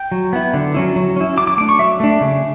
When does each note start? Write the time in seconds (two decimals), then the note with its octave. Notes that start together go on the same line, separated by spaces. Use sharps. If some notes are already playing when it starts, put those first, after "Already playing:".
Already playing: G5
0.12 F#3
0.33 B3 E4
0.54 D3
0.74 F#3 C#4 E4
0.96 F#3
1.16 C#4 E4
1.37 F#3 D6
1.47 D6
1.58 A3 D4 D6
1.69 C#6
1.79 F#3 E5
2.00 A3 D4
2.21 C#3